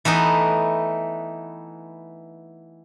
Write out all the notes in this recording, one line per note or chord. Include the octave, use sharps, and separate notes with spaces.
E3 A3 B3 D#4